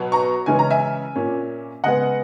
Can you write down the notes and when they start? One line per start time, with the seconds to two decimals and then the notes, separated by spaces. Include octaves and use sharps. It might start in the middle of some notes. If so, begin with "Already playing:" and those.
Already playing: B2 F#3 B3
0.12 A#5 C#6
0.46 C#3 E3 G#3 C#4 G#5
0.59 A#5
0.71 E5 G#5
1.16 A#2 A#3 C#4
1.83 C#3 G#3 B3 D#5 F#5